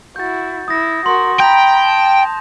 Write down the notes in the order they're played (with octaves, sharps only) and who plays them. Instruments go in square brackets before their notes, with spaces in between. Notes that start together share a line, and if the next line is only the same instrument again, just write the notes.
[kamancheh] E4 F#4 [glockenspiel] G6 A6
[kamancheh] E4 [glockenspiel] D#6 A#6
[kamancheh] F#4 A#4 [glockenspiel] C6
[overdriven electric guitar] G5 [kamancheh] A#5 B5 [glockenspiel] G6 F7
[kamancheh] A5